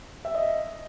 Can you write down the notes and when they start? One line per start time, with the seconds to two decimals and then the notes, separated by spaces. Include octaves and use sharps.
0.25 E5
0.35 D#5